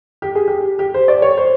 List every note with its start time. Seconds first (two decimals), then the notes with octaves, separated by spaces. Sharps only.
0.22 G4
0.35 G#4
0.48 G4
0.79 G4
0.94 C5
1.08 D5
1.22 C#5
1.37 C5